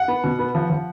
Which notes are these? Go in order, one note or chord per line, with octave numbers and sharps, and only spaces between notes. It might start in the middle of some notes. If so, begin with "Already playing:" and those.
Already playing: F#5
B3
B2
B3
F3
F3